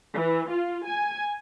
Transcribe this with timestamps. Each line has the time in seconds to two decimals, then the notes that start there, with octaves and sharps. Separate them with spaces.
0.16 E3
0.51 F4
0.86 G#5